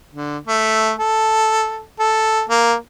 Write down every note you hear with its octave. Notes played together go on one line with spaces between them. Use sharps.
D3
A3
A4
A4
A#3